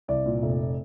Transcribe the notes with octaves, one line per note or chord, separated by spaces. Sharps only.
C2 D5
A#2
F1